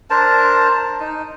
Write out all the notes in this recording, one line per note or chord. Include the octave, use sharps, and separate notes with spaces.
D4 A#4 C5 A5
D#4